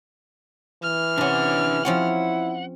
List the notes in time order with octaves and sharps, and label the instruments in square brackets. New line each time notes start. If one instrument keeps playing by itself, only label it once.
[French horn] E3 [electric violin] F6
[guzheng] C3 C#4 [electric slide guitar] D4 F#5
[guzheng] F3 C4 C#4 [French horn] E4 [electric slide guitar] F#5